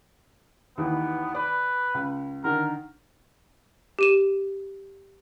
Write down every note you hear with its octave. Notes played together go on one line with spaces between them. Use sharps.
D#2 D#3 E3 B3
B4 D5
C#2
D3 D#3 A#4
G4 D#7 E7